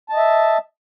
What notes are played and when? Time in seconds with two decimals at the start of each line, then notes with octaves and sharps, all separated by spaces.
0.09 A5
0.13 D#5
0.17 E5